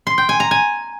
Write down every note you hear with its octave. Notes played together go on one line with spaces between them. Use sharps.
C6
G5
G#5
A#5
G#5